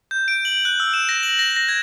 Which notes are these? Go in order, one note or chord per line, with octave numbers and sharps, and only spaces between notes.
G6
D7
F#7
F#6
E6
E7
A#6
F#7
A#6
A#6
G#6